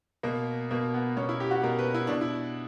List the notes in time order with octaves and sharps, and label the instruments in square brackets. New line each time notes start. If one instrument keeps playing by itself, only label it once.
[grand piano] B2 A#3
B2 A#3
B3
B2 C#4
E4
G4
F#4
B2 A#4
B4
E4
B2 D4
E4